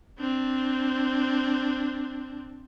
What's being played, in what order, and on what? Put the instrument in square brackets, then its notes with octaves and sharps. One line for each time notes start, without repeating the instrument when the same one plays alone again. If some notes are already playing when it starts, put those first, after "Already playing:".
[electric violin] C4 D4